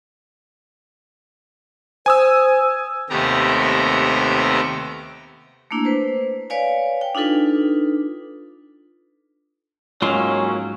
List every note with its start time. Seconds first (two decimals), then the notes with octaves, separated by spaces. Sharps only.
2.06 C5 G#5 D#6 E6
3.10 D#2 C3 A3 B3 G4 A#5
5.71 A3 A#3 D4 E4
5.85 B4 C5
6.50 B4 C#5 D5 F5 G#5
7.01 G5
7.15 D4 D#4 F4 A4 B4
10.02 G#2 F#3 A#3 C#4 F4 C6